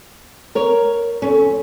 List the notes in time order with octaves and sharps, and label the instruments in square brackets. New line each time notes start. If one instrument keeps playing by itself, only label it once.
[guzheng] B3 [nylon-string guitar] A#4 C#5
[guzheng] F2 A3 C4 [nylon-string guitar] C#4